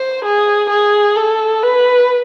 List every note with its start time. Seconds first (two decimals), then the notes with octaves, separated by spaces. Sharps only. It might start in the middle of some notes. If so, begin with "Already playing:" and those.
Already playing: C5
0.25 G#4
0.71 G#4
1.16 A4
1.63 B4